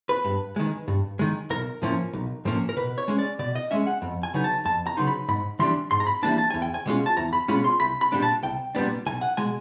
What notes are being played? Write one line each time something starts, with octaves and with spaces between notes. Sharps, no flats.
B4
G2
D#3 G#3
G2
D#3 G#3
B1 A#4
A2 F3 A#3 C#4
B1
A2 F3 A#3 C#4
A#4
B2 B4
C#5
G#3 C#4
D5
B2 D5
D#5
G#3 C#4 E5
F#5
F2
G#5
C#3 F#3 B3 D#4
A5
F2 A5
A#5
C#3 F#3 B3 D#4 C6
B5
G#2 B5
E3 G3 A#3 D4 C6
G#2 C6
A#5
B5
E3 G3 A#3 D4 A5
A5
E2 G#5
G5
G#5
B2 G#3 C#4 F4
A5
E2 A#5
B5
B2 G#3 C#4 F4 B5
C6
C2 B5
B5
A#2 G3 B3 D4
A5
C2 G5
A#2 G3 B3 D4
B1 G#5
F#5
B2 G#3 G#5